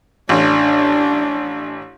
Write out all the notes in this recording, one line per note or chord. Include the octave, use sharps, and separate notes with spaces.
A1 D4